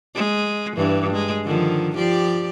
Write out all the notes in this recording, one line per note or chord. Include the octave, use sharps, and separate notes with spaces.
G#3
G2 E3
G#3
D3 D#3 F3
F3 G4 D5